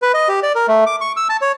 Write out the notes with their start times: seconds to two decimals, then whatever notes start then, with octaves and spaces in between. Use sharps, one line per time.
0.02 B4
0.14 D#5
0.28 G4
0.43 D5
0.55 A#4
0.68 A3
0.86 D6
1.01 C#6
1.16 E6
1.30 A5
1.41 C#5